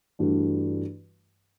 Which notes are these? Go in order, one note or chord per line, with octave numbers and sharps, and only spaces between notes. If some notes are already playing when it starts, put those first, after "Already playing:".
G2 E3 A3 D4 F#4